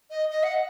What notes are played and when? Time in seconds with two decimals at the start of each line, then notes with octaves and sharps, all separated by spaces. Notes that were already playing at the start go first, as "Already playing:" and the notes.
0.10 D#5
0.30 D#5
0.43 F#5